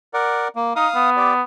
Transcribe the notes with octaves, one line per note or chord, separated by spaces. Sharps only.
A#4 D5 F#5
A#3
D#4 F5 D#6
B3
G4 D5